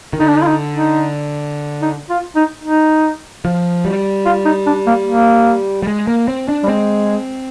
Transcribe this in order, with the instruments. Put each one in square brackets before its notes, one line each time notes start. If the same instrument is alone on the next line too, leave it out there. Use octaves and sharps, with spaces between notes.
[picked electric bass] D#3
[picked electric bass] D3 [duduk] D#4
[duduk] D4
D#4
F4
D#4
D#4
D#4
F4
D#4
D#4
[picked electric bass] F3
G3
[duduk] F4
D#4
D4
A#3
A#3
[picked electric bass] G3
G#3
A#3
C4
D4
[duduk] G3
[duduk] G#3 [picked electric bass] C4